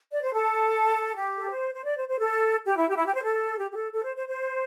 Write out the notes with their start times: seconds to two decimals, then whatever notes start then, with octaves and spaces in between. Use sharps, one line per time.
0.11 D5
0.23 C5
0.34 A4
1.15 G4
1.38 A4
1.50 C5
1.73 C5
1.84 D5
1.96 C5
2.07 C5
2.19 A4
2.65 G4
2.77 E4
2.88 G4
2.97 E4
3.06 G4
3.14 C5
3.23 A4
3.58 G4
3.71 G4
3.75 A4
3.93 A4
4.04 C5
4.16 C5
4.27 C5